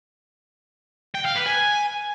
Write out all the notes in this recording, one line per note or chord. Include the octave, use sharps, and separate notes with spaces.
G5
F5
B4
G#5